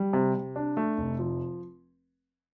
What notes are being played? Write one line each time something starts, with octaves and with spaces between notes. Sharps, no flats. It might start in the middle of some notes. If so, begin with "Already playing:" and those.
Already playing: G3
C3
C3
D4
A3
F1
F3